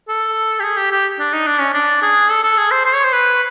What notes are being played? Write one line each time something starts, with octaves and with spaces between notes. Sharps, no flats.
A4
G4
G#4
G4
G4
D4
D#4
D4
C#4
D4
G#4
A4
A4
G#4
C5
C5
C#5
C5
B4